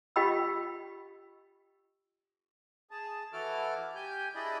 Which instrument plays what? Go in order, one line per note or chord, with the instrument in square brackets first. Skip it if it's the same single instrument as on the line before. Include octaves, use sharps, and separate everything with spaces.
[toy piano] F4 G4 D#5 G5 B5 E6
[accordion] G#4 A5
E3 E4 F#4 A4 D6 F6
G4 G#5 G6
D4 E4 G#4 D5 D#5 B5